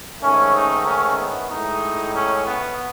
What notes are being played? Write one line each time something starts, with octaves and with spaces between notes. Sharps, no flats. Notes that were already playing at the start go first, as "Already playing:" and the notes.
G#2 D#3 A3 C#4
D#4
C#4
B3
A2 G#3 D#4
C#4
B3